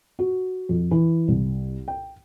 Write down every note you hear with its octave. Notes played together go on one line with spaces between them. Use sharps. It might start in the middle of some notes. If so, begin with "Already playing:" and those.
F#4
F2
E3
C2
G5